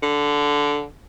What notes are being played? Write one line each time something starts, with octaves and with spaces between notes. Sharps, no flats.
D3